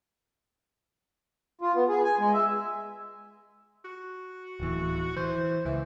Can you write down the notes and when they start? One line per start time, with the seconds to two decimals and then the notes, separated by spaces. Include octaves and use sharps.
1.61 F4
1.75 B3
1.89 G#4
2.04 G#5
2.19 G#3
2.34 E5
3.85 F#4
4.60 D1 E3
5.16 E3 C5
5.65 C#2 E3